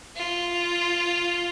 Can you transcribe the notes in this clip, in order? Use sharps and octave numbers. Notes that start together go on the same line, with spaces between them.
F4